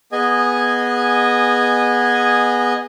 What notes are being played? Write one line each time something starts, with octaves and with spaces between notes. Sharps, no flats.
B3 G#4 D#5 G#5